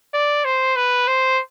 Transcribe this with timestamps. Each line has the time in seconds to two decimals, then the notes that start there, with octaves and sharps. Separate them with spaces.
0.14 D5
0.45 C5
0.76 B4
1.07 C5